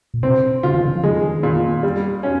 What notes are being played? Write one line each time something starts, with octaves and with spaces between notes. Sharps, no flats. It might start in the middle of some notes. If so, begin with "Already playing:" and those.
A#2
C3 C4
C#3 F4
D#3
C#3
F3
D#3 G#3
A#2
G3
C#4